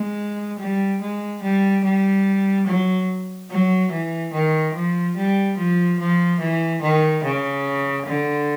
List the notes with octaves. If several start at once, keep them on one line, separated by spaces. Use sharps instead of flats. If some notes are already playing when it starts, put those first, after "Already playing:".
Already playing: G#3
G3
G#3
G3
G3
F#3
F#3
E3
D#3
F3
G3
F3
F3
E3
D#3
C#3
D3